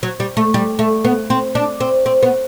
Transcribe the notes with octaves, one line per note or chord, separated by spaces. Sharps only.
F#3
G3
A3
G3
A3
B3
C4
D4
C4
C4
B3